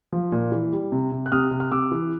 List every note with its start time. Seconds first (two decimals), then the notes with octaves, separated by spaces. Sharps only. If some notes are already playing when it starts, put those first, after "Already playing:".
0.12 F3
0.32 A#2
0.52 E3
0.72 G3
0.92 C3
1.12 C3
1.26 F#6
1.32 C3 D#6 F6
1.51 C3
1.60 F6
1.71 C3 D6 E6
1.92 E3